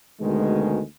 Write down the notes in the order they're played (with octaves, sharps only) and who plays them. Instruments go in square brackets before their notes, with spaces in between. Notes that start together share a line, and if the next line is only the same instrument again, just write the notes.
[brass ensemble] D2 B2 D#3 G#3